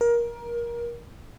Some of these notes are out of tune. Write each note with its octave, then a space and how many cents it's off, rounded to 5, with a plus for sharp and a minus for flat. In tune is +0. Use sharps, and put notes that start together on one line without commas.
A#4 +20